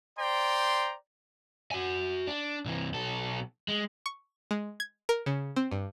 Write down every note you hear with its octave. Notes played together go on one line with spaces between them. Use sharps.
C5 D5 G5 A#5 C6
F#4 G#5
D4
C2 E3
B1 A4
G#3
C#6
G#3
G#6
A#4
C#3
C4
G2